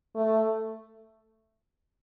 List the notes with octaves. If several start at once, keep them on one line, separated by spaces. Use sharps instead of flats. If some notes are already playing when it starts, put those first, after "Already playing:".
A3